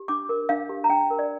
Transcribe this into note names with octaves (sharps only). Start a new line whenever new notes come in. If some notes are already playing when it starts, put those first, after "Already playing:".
Already playing: G4
D4 D6
A#4
D4 F5
G4
A#5
D4 G5
A#4
D5